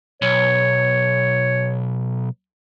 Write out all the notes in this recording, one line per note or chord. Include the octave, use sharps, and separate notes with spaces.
B1 C#5